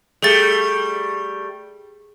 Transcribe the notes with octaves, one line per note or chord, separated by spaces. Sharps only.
G3 A3 G#4 A6